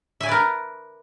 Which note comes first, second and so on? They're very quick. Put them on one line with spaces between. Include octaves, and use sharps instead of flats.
E5 G#5 D5 B4 A#4